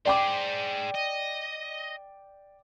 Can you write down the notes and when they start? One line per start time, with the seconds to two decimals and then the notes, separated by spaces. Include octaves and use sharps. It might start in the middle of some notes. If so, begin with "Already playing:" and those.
0.05 G#4 C5 D5 G5 D6
0.95 D#5